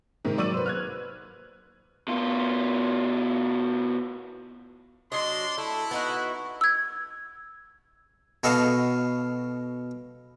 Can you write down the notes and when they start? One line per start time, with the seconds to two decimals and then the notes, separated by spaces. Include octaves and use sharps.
0.25 G#2 C3 D#3
0.38 F#3 D5 C#6 E6 D#7 F#7
0.54 B4 C5
0.66 F6 F#6 G#6
2.08 B2 F4
5.12 F#3 D4 D#5 C6
5.58 A3 E4
5.91 B3 D#4 F#4
6.61 E6 G#6
8.44 B2 F#4 A4 D#5 F5 A5